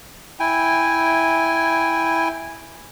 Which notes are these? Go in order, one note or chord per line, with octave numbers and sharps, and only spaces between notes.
E4 G5 G#5